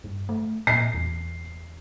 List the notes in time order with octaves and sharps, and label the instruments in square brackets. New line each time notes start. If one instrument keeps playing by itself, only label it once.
[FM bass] G2
A3
[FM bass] A#2 [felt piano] C7
[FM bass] E2